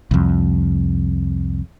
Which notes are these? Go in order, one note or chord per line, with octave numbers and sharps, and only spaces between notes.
C2 F2